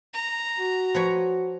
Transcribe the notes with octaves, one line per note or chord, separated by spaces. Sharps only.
A#5
F#4
F3 B4 C#5